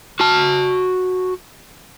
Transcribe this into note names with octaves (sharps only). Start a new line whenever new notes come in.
F#4 A5